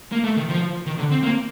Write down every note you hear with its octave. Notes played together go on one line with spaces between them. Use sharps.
A#3
A3
D#3
F3
D#3
D3
C4
A#3